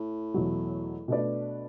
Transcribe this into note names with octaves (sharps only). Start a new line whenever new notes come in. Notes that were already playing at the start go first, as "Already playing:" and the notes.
Already playing: A2
E2 B2 F#3
B2 A3 D4 B4 D5